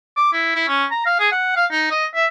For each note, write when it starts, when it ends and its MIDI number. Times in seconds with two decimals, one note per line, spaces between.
0.16 0.30 86
0.33 0.52 64
0.55 0.65 64
0.68 0.85 61
0.91 1.04 82
1.06 1.17 77
1.19 1.28 68
1.32 1.52 78
1.56 1.65 77
1.71 1.89 63
1.91 2.05 75
2.14 2.26 76